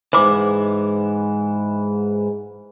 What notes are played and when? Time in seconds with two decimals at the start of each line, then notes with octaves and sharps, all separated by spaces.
0.13 G#2 E3 C5 D6